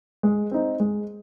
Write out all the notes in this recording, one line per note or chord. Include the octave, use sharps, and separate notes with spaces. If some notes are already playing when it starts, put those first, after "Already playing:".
G#3
C4 D#4
G#3